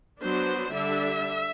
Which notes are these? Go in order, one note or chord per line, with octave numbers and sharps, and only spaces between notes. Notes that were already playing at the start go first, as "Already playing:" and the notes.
F#3 B3 D4 C5
D3 G3 D4 E5